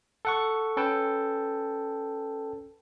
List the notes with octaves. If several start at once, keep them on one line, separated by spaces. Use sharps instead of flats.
A4 F#5 C#6
C#4 A4 B4 G5 A5